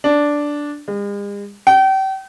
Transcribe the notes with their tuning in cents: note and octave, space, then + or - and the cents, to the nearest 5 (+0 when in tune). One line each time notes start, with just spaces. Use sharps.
D4 -5
G#3 -45
G5 -35